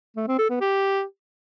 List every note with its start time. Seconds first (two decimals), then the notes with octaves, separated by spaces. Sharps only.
0.17 A3
0.28 C4
0.39 A4
0.50 B3
0.61 G4